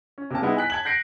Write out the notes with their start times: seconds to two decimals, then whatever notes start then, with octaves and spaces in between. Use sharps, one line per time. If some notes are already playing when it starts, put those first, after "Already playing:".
0.18 C#4
0.31 C3 A#3 A5
0.42 G3 G#3 B3 D#4 E4
0.57 G#5 F#6 B6
0.70 A5 G#6 F#7
0.85 G6 A#6 C7 D7